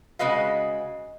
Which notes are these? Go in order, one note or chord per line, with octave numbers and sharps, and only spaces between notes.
C#3 G#3 F#4 B4 D#5 F5